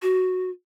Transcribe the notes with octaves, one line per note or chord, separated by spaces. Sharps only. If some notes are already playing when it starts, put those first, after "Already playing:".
F#4